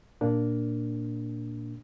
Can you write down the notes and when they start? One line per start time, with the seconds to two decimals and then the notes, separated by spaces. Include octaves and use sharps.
0.21 A#2 A#3 D4